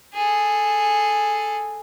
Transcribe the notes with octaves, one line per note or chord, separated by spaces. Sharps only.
G#4 A4